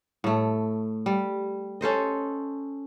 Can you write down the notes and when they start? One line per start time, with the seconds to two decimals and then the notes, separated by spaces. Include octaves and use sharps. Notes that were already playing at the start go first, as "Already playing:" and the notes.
0.24 A2 A3
1.06 G3
1.81 C#4 A4 C5 D#5